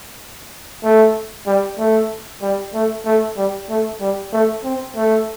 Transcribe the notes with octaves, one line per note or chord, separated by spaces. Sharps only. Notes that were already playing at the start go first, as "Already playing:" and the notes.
A3
G3
A3
G3
A3
A3
G3
A3
G3
A3
C4
A3